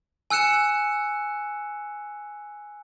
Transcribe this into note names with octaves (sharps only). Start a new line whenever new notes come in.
G#5 E6 F#6 C#7 E7